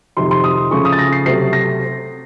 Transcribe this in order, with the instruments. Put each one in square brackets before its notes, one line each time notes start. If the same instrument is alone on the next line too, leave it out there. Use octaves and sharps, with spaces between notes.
[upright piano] F2 C3 D#3 C6
C6
D#6
C#3 F3 A3 C#4 C#6
D#6
A6
A#6
C7
C3 F#3 A3 C4 C7
A#6